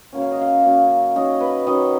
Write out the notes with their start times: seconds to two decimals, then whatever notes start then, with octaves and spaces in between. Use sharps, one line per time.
0.13 C#3 F#3 A#3 C#4
0.22 F5
0.32 D#5
0.41 F5
0.64 C#3 F#3 A#3 C#4
1.16 D#3 F#3 C#4 D#5
1.41 B4
1.67 D#3 F#3 C#4 D#5